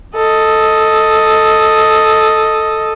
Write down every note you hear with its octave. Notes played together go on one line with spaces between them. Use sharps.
A4 D#5